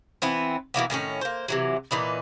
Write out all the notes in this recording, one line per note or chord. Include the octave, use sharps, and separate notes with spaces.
E3 B3 C4
B2 E3 A#3 B3
A2 D#3 C4 C#4
A#3 C5
C3 E3 F#3
A#2 E3 D#4 B4